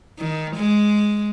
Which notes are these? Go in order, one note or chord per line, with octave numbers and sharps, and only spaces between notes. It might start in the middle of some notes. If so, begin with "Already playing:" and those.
D#3
G#3